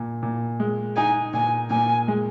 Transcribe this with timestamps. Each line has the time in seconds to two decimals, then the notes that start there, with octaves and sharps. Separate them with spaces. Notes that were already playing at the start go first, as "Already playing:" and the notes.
Already playing: A#2
0.23 A#2
0.60 G#3
0.97 D#4 G#5
1.33 A#2 G#5
1.70 A#2 G#5
2.08 G#3